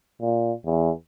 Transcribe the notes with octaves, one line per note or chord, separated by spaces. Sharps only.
A#2
E2